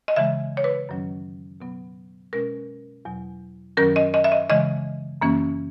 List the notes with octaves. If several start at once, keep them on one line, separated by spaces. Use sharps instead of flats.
D#5
C#3 E3 G#3 E5
C#5
B4
F#2 D#3 F#3 C#4
B2 F#3 B3
B2 G#3 C#4 A#4
E2 B2 F#3
F#2 D#3 F#3 C#4 A#4
D#5
D#5
E5
D#5
C#3 E3 G#3 D#5
F#2 E3 A#3 C#4